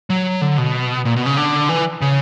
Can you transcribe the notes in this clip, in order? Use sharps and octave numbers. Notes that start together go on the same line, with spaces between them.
F#3
D3
B2
A#2
B2
C#3
D3
E3
C#3